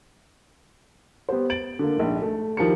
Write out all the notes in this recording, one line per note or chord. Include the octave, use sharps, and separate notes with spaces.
B3 G4 C5
A6 D7 F#7
D3 A#3
A#1 G#2
A3
D#3 F3 E4 G4 A#4 C#7